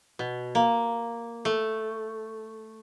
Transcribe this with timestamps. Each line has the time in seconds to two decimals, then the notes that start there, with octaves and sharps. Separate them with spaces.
0.19 B2
0.55 A#3
1.45 A3